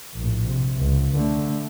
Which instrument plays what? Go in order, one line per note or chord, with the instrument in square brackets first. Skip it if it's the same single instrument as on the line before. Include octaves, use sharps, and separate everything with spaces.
[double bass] A#1 A2
C3
C#2
D3 A3